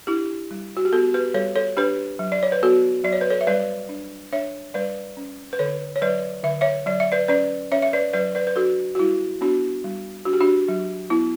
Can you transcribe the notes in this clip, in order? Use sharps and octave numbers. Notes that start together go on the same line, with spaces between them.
D4 E4 G4
G3
F#4
G4
B3 F#4 A4
G4 B4
G3 A4 C#5
A4 C#5
D4 G4 B4
F#3
D5
C#5
B4
B3 F#4 A4
F#3 D5
C#5
B4
A4 C#5
E5
G3 B4 D5
D4
D4 C#5 E5
G3 B4 D5
C#4
B4
D3 A4 C#5
C#5
F#3 B4 D5
D3 E5
C#5 E5
F#3 D5
E5
B4 D5
C#4 B4 D5
C#4 C#5 E5
E5
B4 D5
F#3 B4 D5
B4 D5
B4
D4 F#4 A4
F#4
G3 E4
B3 D4 F#4
G3
D4 F#4
G4
D4 F#4
F#3
B3 E4